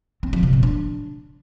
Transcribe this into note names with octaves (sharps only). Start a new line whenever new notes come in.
C4
F3
C3
A#2
D4